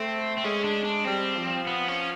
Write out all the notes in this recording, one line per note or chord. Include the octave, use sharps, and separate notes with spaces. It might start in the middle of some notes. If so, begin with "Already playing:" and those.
Already playing: A3 C4
C4
G#3 C#4
D4
D4
G3 C4
F3
B3
C#4